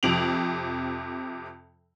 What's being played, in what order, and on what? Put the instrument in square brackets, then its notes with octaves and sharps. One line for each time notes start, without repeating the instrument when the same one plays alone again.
[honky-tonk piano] F2 C3 D7 F7 F#7